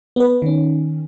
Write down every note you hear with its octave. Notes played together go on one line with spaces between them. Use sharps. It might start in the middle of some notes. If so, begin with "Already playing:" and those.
B3 B4
D#3 C#4